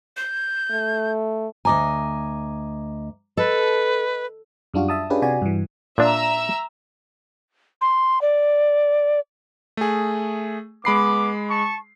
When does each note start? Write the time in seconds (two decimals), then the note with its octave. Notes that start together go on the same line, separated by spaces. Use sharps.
0.17 G6
0.71 A3
1.65 D2 D#5 G#5 A#5 D6
3.37 A4 B4 D#5
4.74 F#2 G3 D4 F4 F#4
4.89 E5 A5 D#6
5.10 C#4 D4 F4 G4 G#4 B4
5.22 C3 F#4 D5 G#5
5.42 G2 E3
5.98 A#2 D4 E5 A#5 E6
7.81 C6
8.21 D5
9.77 A3 G#4
10.85 G#3 B3 B5 D6 C7
11.49 A5 C#6